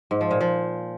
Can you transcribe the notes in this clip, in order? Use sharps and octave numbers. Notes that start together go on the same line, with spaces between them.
G#2
F3
A#2
F3